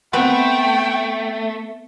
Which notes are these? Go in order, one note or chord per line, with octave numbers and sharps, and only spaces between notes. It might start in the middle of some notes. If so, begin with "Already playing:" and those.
A3 B3 C4 B4 G5